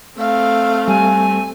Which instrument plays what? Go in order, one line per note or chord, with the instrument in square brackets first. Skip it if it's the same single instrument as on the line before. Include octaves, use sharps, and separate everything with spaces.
[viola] A3 C4 [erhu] F5
[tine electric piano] G3 [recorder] G#5